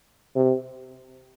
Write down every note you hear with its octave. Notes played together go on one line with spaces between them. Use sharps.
C3